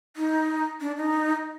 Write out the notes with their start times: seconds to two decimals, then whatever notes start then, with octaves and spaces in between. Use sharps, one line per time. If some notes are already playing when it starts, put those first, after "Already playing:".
0.17 D#4
0.81 D4
0.97 D#4